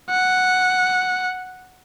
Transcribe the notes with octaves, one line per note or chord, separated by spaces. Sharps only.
F#5